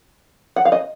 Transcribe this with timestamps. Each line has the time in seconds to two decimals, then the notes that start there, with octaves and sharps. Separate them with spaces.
0.56 F#5
0.65 F5
0.72 D#5